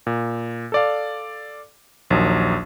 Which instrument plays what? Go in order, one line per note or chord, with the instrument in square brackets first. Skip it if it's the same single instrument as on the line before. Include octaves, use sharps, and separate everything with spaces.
[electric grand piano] A#2
A4 D5 F5
A#1 D#2 F#3